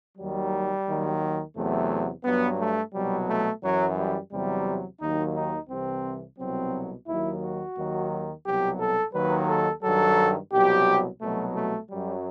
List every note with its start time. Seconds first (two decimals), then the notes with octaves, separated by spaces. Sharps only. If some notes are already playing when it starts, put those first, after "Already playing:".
0.17 D#2 D#3 F#3 G3
0.86 D#2 D#3 F#3
1.55 E2 C3 F#3 A3
2.25 G2 F#3 B3
2.58 A3
2.93 C2 B2 F#3 G3
3.28 A3
3.62 F#2 E3 F#3
3.97 G3
4.31 E2 C3 F#3 G3
5.00 D#2 D#3 F#3 D#4
5.34 D#4
5.69 C2 C3 E3 C4
6.38 C2 B2 F#3 C4
7.07 D#2 D#3 F#3 E4
7.42 F#4
7.76 D#2 D#3 F#3
8.45 C2 B2 F#3 G4
8.79 A4
9.14 D#2 D#3 F#3 B4
9.49 A4
9.83 G2 D#3 F#3 A4
10.52 C2 B2 F#3 G4
11.21 C2 B2 F#3 A3
11.56 A3
11.90 F#2 F#3 G3